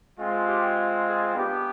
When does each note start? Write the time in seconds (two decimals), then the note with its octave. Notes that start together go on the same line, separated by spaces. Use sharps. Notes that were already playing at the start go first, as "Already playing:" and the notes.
0.19 G#3 C4 F4
0.48 G4
1.06 G#4
1.34 B3 D4 G4